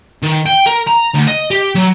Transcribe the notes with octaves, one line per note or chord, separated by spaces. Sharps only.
D#3
G5
A#4
A#5
D2
D#5
G4
F#3